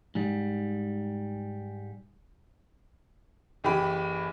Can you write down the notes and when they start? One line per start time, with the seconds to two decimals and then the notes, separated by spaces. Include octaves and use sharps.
0.15 G#2 G3
3.64 F#1 E3 G4 B5